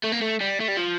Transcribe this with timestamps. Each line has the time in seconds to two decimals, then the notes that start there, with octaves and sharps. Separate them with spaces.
0.04 A3
0.12 A#3
0.22 A3
0.41 G3
0.60 A3
0.68 G3
0.77 F3